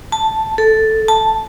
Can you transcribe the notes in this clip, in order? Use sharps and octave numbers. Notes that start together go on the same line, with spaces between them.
A5
A4
A5